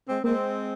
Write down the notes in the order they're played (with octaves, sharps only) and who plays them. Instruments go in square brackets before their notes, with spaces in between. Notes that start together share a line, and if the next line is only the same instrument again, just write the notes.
[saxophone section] G#3 C4
[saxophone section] G#3 C4 [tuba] A#3